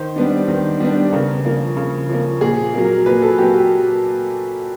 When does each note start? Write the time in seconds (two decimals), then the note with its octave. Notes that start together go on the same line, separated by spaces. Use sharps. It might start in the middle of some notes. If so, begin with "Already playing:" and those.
Already playing: D#3 C5
0.16 G3 B3 D4
0.48 D#3
0.80 G3 B3 D4
1.13 C#3 A#4
1.45 F3 A#3
1.77 C#3
2.09 F3 A#3
2.41 A#2 G#4
2.74 F#3 A#3
2.85 A#4
3.06 A#2 B4
3.22 A4
3.38 F#3 A#3 G4
3.54 G4